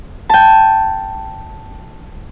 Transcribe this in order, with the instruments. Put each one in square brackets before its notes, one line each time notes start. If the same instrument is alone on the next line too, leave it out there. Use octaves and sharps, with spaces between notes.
[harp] G5 A5